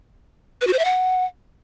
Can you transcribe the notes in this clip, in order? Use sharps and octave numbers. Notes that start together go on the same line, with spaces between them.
B4
F#4
C5
E5
F#5